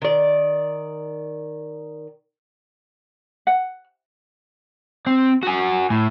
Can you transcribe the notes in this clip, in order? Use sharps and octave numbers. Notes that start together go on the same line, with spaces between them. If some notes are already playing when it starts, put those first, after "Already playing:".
D#3 D5
F#5
C4
F#4 G#5
A2